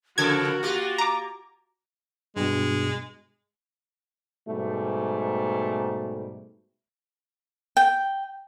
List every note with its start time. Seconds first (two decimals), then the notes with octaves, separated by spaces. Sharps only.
0.18 C#3 F3 F#4 A4 A#4 G#6
0.63 A#3 F4 G4
0.98 A#5 D6
2.36 G2 B2 G#3
4.48 G#2 B2 G3 A3
7.77 G5